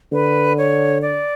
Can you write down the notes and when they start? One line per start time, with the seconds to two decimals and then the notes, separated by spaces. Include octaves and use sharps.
0.12 D3 B4
0.58 C#5
1.02 D5